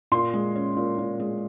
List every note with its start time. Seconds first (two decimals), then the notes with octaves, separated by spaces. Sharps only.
0.12 A#2 C6
0.34 G#3
0.56 C#4
0.77 A#2
0.99 A#2
1.20 G#3